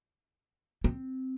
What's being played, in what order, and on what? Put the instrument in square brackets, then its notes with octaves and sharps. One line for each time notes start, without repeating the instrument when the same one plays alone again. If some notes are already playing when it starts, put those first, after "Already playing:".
[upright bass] C4